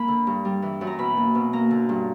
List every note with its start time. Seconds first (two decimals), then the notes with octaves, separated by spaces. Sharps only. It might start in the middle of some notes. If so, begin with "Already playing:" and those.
Already playing: A#3 B5
0.08 D3
0.27 G2
0.45 G3
0.62 E3
0.81 F#2
0.87 A#5
0.99 B2 B5
1.17 A#3
1.35 B2
1.53 A#3 A#5
1.71 D3
1.89 G2